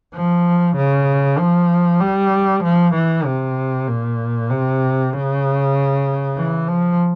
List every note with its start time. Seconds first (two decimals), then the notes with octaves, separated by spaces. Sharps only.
0.13 F3
0.76 C#3
1.38 F3
2.00 G3
2.63 F3
2.94 E3
3.26 C3
3.87 A#2
4.50 C3
5.13 C#3
6.37 E3
6.69 F3